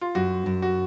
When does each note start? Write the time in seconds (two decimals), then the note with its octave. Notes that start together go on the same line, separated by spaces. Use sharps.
0.01 F4
0.15 F#2 F#4
0.46 F#2
0.62 F#4